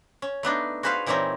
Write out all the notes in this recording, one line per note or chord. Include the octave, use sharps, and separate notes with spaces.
C#4
A3 B3 D4 D#4
F#4 G#4 B4 C5 F5
A#2 E3 G3 C4 C#4 D#4